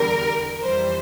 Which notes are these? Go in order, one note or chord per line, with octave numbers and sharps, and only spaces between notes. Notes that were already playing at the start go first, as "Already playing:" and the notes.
Already playing: E2 D3 G3 A#4
F2 E3 G3 C5